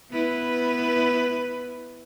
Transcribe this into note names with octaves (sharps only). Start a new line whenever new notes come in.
B3 E4 B4